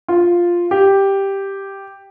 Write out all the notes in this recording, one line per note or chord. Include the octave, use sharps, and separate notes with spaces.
F4
G4